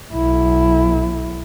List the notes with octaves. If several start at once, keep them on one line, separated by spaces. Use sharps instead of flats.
B1 E4